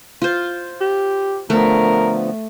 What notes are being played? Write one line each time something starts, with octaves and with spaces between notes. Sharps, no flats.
F4 C5
G4
D3 F3 A3 B3 A#4